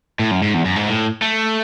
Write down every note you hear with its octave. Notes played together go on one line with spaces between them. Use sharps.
A2
F#2
G#2
E2
F#2
G#2
A2
A3